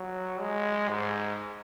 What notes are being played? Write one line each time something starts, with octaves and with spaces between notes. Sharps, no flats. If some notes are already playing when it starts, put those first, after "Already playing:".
Already playing: F#3
G#3
G#2